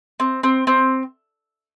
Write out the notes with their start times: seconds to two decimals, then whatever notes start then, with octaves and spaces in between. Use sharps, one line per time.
0.20 C4
0.43 C4
0.67 C4